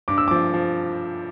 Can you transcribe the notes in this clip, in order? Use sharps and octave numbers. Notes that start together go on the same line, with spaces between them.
G2 D6
E6
F3 D6
F3